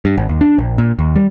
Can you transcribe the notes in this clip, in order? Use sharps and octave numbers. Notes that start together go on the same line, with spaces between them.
G2
G#1
D#2
D4
A#1
A#2
D#2
G3